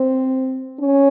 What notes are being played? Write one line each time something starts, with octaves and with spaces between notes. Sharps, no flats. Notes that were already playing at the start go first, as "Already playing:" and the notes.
Already playing: C4
C#4